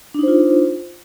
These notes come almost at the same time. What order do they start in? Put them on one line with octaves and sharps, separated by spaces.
D4 D#4 C5 F4